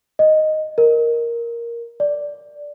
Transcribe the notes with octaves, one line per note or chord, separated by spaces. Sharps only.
D#5
A#4
D5